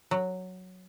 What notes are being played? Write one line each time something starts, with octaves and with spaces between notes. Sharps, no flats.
F#3